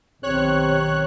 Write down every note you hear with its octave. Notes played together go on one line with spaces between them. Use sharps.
B1 D#3 C4 G4 C#5 F#6